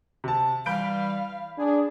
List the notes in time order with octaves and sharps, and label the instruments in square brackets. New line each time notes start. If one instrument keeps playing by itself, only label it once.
[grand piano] C3 A5
[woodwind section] E3 G3 [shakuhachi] F5 [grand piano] B5 G6 D7
[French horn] D4 [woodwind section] G#4